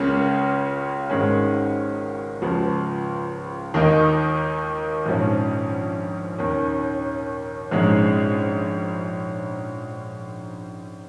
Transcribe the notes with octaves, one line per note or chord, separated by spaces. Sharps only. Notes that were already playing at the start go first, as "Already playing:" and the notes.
Already playing: C#2 C#3 A#3 C#4
G#1 G#2 D#3 G#3 C#4
C#2 C#3 F3
D#2 D#3 A#3 D#4
A#1 G#2 F3 C#4
D#2 D#3 C#4
A#1 G#2 G#3 C#4